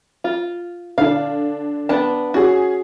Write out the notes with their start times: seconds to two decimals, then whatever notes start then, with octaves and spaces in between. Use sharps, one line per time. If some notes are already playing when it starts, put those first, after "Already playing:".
0.24 F4
0.98 D3 D4 F5
1.89 B3 D4 A5
2.34 C#4 F#4 G#4